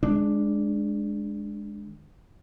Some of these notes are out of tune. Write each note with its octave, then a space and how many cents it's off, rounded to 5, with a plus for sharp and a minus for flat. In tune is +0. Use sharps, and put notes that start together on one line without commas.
D#3 -45 G#3 +0 D4 +0